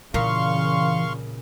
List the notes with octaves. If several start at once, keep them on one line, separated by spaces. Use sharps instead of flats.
A#2 C#3 E3 F5 C6 C#6